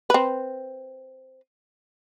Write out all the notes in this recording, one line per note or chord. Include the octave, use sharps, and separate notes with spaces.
C4 B4